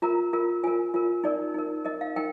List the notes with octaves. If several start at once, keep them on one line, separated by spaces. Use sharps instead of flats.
F4 A#4 A#5
F4 A#4
F4 A#4 G#5
F4 A#4
D#4 A#4 D5
D#4 A#4
D#4 A#4 D#5
F5
D#4 A#4 G5